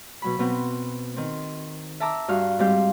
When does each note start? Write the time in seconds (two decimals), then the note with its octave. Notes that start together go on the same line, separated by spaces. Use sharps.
0.22 B2 F#3 B5
0.39 B2 B3 C4
1.16 D#3 C4
2.00 E5 A5 A#5 D6 E6
2.28 G2 F#4 F5 F6
2.59 G#2 G3 C4 G4 F5 G6